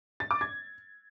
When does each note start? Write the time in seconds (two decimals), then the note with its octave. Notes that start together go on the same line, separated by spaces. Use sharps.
0.20 A6
0.31 D6
0.41 G#6